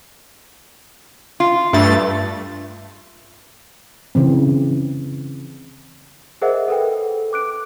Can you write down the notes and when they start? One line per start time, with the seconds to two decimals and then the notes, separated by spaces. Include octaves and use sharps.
1.40 F4
1.73 G2 A3 A6
4.15 C#3 E3 C4
6.42 G#4 A#4 C5 D#5 E5 F#5
6.68 A4 B4 G5
7.33 D6 F#6 D7